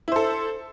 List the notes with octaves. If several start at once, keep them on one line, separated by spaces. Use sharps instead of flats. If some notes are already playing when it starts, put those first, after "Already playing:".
E4 A4 C5